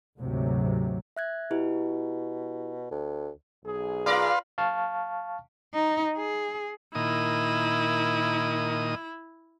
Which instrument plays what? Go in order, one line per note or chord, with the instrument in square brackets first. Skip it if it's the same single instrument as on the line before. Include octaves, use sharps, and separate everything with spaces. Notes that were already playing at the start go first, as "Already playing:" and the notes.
[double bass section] D2 G#2 C3 F#3
[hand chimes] E5 F#6 G#6
[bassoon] B2 [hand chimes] E4 G4
[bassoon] D2
[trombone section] B1 G#4
[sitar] F4 A#4 D5 [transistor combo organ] B4 F5 C6
[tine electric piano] F5 A5 C#6 F6
[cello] D#4
G#4
[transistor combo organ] A#2 D#3 D#6 [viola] E4